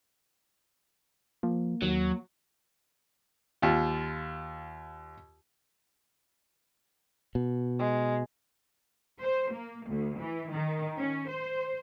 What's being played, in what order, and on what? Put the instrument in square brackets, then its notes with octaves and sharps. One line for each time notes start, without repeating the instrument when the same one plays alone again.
[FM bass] F3 [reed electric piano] A#3
[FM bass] D#2 [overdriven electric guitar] F#3
[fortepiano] D#2 F4
[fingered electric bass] B2
[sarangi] G#3
[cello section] C5
A#3
D2
E3
D#3
C#4
C5